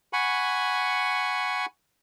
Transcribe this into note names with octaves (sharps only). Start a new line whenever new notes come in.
F#5 G#5 B5 C#6